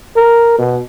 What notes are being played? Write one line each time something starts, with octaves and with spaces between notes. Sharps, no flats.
A#4
B2